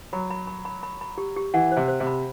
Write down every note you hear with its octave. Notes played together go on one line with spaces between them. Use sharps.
F#3 B5
B5
B5
B5
B5
B5
G4
G4
E3 F#5
C3 C5
C5
C3
B5